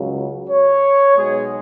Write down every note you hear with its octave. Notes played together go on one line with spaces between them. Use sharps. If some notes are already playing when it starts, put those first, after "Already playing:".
Already playing: C#2 C#3 F#3
C#5
B1 B2 G#3 G#4